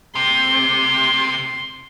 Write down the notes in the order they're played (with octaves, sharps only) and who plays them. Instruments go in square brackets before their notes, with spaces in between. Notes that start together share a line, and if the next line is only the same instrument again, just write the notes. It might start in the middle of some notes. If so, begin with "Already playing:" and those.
[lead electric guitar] C3 [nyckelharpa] C6